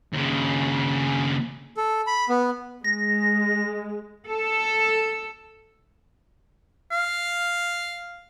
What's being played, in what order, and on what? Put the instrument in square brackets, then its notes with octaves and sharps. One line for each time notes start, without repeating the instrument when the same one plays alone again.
[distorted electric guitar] D#2 C#3
[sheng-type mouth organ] A4
B5
B3
[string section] G#3 [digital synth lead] A#6
[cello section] A4
[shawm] F5